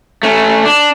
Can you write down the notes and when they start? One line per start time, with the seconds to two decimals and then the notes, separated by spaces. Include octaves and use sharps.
0.23 A3 C#4
0.65 D4